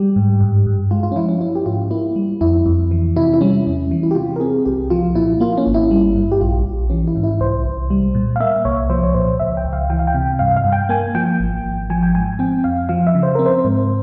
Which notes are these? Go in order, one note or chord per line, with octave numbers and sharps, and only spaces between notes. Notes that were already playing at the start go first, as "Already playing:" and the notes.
Already playing: G3 G4
G#2
G2
G2
G#3 F4
F4
C#4
F3 E4
C#4
C#4 E4
G4
G#2 F4
A#3 E4
G3
F2 E4
F2
E3
C3 E4
E4
G3 C#4
E2
E3
E4
G4
C3 F4
A#4
C4 G#4
C2 G4
F3 F4
A#2 E4
A#3 F4
C#4
G#1
E4
G3
G2
G4
A#1 F4
A#1
E3 C#4
E4
G#2
E4
C2 C5
C2
G3
A#2
F5
A#3 E5
C2 C#5
F3 C5
C#5
A#2 C5
C#2 E5
G5
C#2
F5
E3 G5
F5
G5
C3
G2 F5
F5
G2
G5
A#3 G#5
F3 G5
G#1
G#1
F3 G#5
G5
G#2 G#5
C4 G5
F2 F5
F3 F5
E5
C#3
C5
C4 A#4
C5
G#2